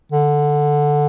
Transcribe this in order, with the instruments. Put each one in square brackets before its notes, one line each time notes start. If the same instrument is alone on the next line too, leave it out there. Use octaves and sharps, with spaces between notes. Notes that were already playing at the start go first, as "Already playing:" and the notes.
[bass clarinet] D3